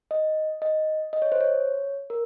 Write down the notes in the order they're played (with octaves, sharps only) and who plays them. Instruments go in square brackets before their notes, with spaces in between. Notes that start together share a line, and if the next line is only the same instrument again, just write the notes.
[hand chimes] D#5
D#5
D#5
C#5
C5
C#5
A#4